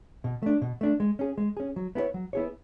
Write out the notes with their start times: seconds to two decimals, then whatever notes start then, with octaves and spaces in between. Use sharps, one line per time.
0.24 B2
0.42 A3 D4
0.62 B2
0.81 A3 D4
1.00 G#3
1.19 C#4 G#4
1.38 G#3
1.57 C#4 G#4
1.76 F#3
1.95 B3 E4 G#4 C#5
2.14 F#3
2.33 B3 E4 G#4 C#5